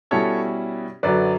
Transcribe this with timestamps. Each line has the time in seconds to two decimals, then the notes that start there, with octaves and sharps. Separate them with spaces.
0.11 B2 G3 C#4 E4 A4 C#5
1.03 F#2 D3 F#3 B4 D5